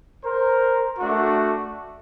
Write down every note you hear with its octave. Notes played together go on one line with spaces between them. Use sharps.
A#4 C5
A3 D4 F#4